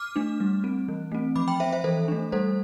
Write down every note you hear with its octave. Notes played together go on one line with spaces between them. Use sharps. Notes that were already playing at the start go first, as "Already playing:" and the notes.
Already playing: D6 F6
A3 D4
G3
C4
E3
A3 C4
F3 B5 D6
G5 B5
C4 C5 E5
C5 E5
E3 A4 C5
A3 D4
G3 A4 C5